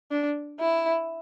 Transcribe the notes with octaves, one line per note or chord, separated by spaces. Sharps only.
D4
E4